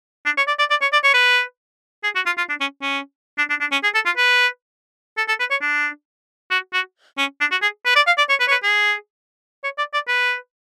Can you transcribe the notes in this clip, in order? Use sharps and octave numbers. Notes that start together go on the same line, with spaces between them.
D4
C#5
D5
D5
D5
C#5
D5
C#5
B4
G#4
F#4
F4
F4
D4
C#4
C#4
D4
D4
D4
C#4
G#4
A4
F4
B4
A4
A4
B4
C#5
D4
F#4
F#4
C#4
D4
F#4
G#4
B4
D5
F5
D5
C#5
B4
C#5
B4
G#4
C#5
D5
D5
B4